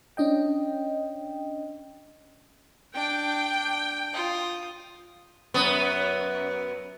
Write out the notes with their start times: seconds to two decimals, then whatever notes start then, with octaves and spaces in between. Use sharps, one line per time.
0.17 C#4 D4 D#5 G5
2.95 D4 G5
4.14 F4 D#6
5.54 F#2 B3